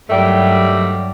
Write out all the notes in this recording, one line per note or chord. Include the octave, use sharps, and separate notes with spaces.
G2 D#3 F#3 G3 A3